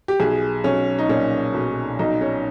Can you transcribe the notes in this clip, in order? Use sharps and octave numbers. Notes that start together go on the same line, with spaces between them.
G4
B1 G#4
B1 C#4
D#4
A#2 C#4
B1
B1 D#4
C#4